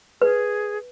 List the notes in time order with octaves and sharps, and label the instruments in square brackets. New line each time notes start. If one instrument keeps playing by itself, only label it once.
[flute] G#4 [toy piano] B4